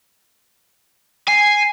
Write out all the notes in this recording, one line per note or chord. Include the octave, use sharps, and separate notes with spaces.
G#5 C7